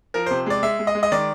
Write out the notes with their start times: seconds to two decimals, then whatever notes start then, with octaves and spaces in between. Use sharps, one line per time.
0.14 F3 A#4
0.26 C3 C5
0.46 G#3 D5
0.63 G#3 E5
0.79 G#3
0.87 D#5
0.95 G#3
1.03 D#5
1.12 D#3 D5